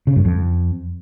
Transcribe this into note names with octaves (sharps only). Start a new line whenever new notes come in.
C#3
G2
F2